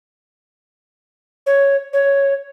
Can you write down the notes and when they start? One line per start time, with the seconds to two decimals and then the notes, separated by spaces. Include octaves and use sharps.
1.46 C#5
1.93 C#5